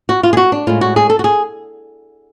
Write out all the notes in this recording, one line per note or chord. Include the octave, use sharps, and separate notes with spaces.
F#4
F4
G#4
F#4
D4
A2 G#3 F4
F#4
G#4
A4
F#4
G#4